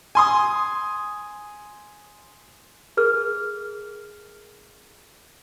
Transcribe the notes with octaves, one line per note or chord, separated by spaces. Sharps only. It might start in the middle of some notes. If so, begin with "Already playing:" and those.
G#5 C6 D#6
G#4 A#4 F6